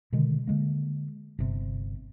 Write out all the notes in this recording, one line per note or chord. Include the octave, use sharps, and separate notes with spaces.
B2 D3 D#3 G#3
D3 G#3 A#3
G1 C3